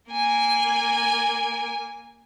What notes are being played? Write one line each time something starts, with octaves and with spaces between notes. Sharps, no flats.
A#3 G#5